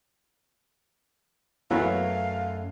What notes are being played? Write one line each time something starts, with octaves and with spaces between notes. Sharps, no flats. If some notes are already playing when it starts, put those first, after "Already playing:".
F#2 E3 F#3 A3 B3 F5